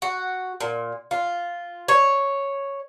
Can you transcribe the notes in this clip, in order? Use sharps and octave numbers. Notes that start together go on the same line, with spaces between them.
F#4
A#2
F4
C#5